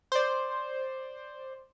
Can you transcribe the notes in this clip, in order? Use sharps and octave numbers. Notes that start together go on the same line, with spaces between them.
C5 D5